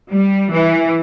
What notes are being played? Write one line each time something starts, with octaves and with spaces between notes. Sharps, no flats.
G3
E3